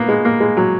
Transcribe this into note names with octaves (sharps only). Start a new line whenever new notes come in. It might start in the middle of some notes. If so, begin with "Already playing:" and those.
Already playing: A#3 B3
G#3
A#3
G#3
F#3